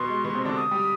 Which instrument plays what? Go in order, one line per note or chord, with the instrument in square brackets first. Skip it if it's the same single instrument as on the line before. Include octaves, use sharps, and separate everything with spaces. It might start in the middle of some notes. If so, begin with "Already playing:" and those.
Already playing: [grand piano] B2 B3 [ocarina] C6
[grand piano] G#3
B2 B3
C3 C4
D3 D4
[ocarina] D#6
[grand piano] G3 G4